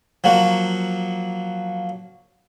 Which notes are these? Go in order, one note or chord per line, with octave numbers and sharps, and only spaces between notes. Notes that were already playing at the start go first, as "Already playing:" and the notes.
F3 F#3 A#3 F#4